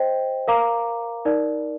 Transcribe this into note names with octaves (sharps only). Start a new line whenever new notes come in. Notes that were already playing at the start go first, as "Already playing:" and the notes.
Already playing: C5 D#5 G5
A#4 F5 A#5 D6
D#4 A#4 D5